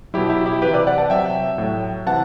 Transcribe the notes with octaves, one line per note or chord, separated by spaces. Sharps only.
B2 F#3 E4 G4
E4 G4
E4 G4
C3 E3 G4 B4
B4 D5
D5 F#5
F#5 A5
C3 F#3 E5 G5
A2 F#3
C3 E3 F#5 A5